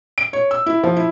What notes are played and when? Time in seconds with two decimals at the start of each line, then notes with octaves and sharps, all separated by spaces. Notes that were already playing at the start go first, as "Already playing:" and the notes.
0.18 D7
0.33 C#5
0.51 E6
0.66 E4
0.83 F3
0.97 E4